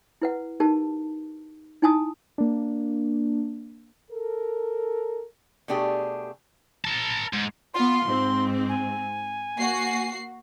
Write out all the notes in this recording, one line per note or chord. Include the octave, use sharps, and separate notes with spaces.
E4 B4 F#5
D#4 G4 A#4 A5
D#4 E4 G#5 A5 D#6
A#3 D4
A4 A#4
B2 A3 D4 G4 G#4
A#4 A5
G#2
B3 F4 C6
G#2 C4
G#5
A#3 F#4 C7